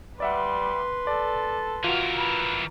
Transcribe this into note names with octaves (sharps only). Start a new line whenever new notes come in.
G3 B4 D5 E5 F#5 C6
A4 D5
E3 F4 F#4 A#4
B4